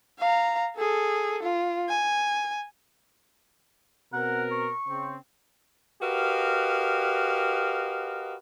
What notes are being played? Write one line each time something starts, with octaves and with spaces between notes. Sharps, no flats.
F5 A#5
G#4 A4
F4
G#5
B2 C4 A#4 F#5
C#6
C#3 C4
F#4 G4 A#4 B4 D#5 F5